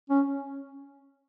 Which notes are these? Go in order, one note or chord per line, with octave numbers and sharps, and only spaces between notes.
C#4